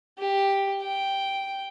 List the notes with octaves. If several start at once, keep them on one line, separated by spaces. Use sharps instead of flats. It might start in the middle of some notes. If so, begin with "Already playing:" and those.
G4
G5